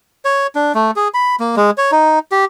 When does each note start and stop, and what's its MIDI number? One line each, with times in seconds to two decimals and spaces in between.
0.25 0.47 73
0.55 0.72 62
0.75 0.91 57
0.96 1.08 68
1.14 1.36 83
1.40 1.55 58
1.56 1.71 56
1.78 1.91 73
1.92 2.19 63
2.32 2.45 67